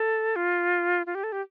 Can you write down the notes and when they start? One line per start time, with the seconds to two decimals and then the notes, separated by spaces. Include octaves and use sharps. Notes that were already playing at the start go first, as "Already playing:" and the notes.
Already playing: A4
0.36 F4
1.06 F4
1.15 G4
1.24 A4
1.32 G4